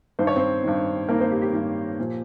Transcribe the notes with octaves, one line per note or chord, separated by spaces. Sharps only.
G2 D#3 C5
C#5
C4 C5
G2 D#3
G2 D#3 A#3 A#4
C4 C5
G4
G4
G2 D#3 G4
A#2 F3